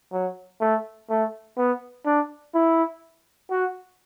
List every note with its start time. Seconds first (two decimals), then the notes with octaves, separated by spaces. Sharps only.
0.12 F#3
0.61 A3
1.10 A3
1.57 B3
2.06 D4
2.54 E4
3.50 F#4